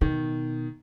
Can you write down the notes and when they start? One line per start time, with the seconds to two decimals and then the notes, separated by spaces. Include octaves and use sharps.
0.01 B2 D#3